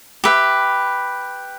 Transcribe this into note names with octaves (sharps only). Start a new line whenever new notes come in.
G4 B4 E5